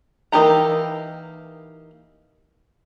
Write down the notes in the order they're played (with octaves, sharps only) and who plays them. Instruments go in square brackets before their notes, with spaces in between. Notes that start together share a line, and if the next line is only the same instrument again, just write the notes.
[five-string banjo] E3 A#3 D#4 G4 A#5